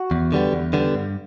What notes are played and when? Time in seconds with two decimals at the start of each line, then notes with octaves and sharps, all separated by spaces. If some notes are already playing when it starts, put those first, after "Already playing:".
Already playing: F#4
0.11 E2
0.32 D3 G3 B3
0.53 E2
0.73 D3 G3 B3
0.95 G2